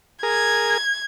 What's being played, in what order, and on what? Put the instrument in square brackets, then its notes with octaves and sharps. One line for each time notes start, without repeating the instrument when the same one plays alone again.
[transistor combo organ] G#4 A#4 [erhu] G#6